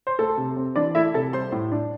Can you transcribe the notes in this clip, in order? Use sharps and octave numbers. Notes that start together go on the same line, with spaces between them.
C5
A3 A4
C3
C4
E3 D4 D5
A3 E4 E5
C3 A4 A5
G3 C5 C6
A2
D4